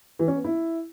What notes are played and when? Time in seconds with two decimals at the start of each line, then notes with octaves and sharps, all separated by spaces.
0.19 E3
0.28 C#4
0.36 B3
0.44 E4